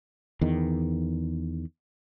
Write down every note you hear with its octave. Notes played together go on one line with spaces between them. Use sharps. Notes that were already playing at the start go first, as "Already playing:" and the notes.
E2 D#3